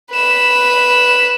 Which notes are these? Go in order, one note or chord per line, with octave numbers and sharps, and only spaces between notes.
B4 E7